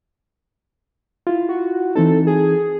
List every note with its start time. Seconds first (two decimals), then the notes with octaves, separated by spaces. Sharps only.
1.27 E4 F4
1.49 F#4
1.95 E3 C4 D#4 A4
2.27 G#4